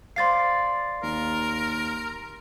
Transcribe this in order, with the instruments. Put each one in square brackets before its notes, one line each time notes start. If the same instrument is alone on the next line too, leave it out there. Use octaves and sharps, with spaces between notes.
[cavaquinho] C5 D5 F5 [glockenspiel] C6 A6 C7
[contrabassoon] D#2 [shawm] A#4